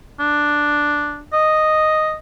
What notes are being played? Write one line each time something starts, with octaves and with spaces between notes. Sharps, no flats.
D4
D#5